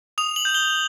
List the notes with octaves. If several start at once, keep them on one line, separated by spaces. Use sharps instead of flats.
D#6 F7
F#7
G6
G7